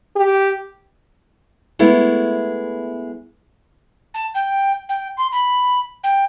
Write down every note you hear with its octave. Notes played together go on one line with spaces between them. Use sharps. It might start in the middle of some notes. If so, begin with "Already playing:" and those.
G4
G#3 A3 B3 E4
A5
G5
G5
C6
B5
G5